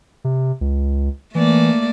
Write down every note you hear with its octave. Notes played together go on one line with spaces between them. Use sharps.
C3
C#2
E3 A3 A#3 D5